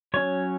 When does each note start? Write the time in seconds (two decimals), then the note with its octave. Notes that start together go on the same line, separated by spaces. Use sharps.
0.14 F#3 C#4 C#5